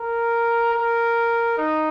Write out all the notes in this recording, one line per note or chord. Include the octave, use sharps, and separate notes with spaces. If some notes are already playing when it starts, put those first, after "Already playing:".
Already playing: A#4
A#4
D#4